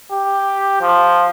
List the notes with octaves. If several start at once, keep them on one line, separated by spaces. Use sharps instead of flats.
G4
F3